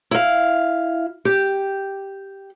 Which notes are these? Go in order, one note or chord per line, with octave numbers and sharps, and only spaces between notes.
E4 F5
G4